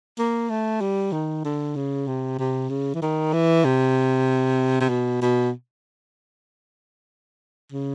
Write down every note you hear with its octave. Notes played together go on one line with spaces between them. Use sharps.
A#3
A3
G3
D#3
D3
C#3
C3
C3
C#3
E3
D#3
E3
C3
C3
B2
B2
C#3